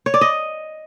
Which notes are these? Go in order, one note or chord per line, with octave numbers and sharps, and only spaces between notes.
C#5
D5
D#5